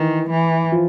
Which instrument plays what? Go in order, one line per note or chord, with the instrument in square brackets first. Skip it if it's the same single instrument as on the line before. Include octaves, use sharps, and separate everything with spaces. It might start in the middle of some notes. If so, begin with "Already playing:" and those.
Already playing: [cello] D#3 [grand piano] E3
[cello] E3
[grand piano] F3